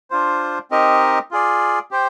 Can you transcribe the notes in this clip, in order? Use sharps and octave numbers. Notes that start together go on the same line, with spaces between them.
D4 F4 C5
C4 D#4 G4 A#4 D#5
F4 G#4 D5
G4 C5 G5